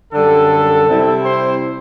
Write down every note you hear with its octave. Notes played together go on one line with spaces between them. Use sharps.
F#2 D3 G3 A4
C3 G3 C4 E4
C5